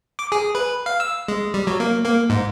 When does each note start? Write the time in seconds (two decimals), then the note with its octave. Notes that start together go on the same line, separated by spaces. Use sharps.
0.19 D6
0.32 G#4
0.55 B4
0.86 F5
1.00 E6
1.28 G#3
1.54 G3
1.67 F#3
1.80 A#3
2.05 A#3
2.30 G#2